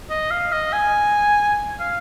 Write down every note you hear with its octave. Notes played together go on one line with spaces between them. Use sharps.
D#5
F5
D#5
G#5
F5